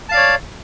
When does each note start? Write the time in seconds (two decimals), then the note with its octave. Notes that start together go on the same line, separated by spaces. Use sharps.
0.09 A5
0.12 F5
0.14 D5
0.17 C#5